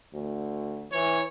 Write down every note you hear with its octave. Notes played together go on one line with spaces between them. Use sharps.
D2
E3 C#5